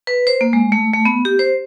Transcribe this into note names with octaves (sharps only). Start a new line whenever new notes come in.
B4
C5
A#3
G#3
A3
A3
B3
G4
C5